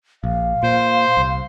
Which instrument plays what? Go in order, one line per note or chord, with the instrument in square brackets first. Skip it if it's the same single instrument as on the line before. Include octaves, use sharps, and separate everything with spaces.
[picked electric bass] A#1 [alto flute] F5
[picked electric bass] A#2 [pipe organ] C5
[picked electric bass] C2